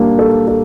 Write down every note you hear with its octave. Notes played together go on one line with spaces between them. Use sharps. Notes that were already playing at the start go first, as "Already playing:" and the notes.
Already playing: G3 A#3 D4
A4
A4